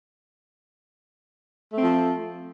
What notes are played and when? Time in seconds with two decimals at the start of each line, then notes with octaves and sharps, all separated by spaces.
1.73 A3
1.78 C4
1.82 F3